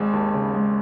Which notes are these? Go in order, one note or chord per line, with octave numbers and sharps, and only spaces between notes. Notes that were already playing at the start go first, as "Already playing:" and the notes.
Already playing: G#1 G#3
D#2
C#3
G#3